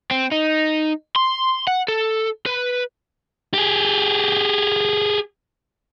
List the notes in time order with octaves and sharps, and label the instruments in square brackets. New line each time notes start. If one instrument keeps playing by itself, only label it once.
[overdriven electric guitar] C4
D#4
C6
F#5
A4
B4
[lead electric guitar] G4 G#4